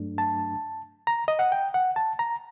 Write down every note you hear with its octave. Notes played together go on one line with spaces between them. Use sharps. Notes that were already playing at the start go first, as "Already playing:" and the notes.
Already playing: G2 F#3 A3 D4
A5
A#5
D#5
F#5
G5
F#5
A5
A#5